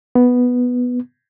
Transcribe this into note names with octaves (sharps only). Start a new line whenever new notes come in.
B3